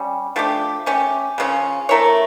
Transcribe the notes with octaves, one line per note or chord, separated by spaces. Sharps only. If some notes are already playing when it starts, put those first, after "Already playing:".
Already playing: G3 C#4
F3 A3 D4 G4
A3 C#4 G4
C#3 F3 C#4
A3 E4 A#4 C#5